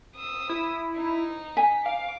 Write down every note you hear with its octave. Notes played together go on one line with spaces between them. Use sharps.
D#6 E6
E4
D#4
G#5 B6
F5 D6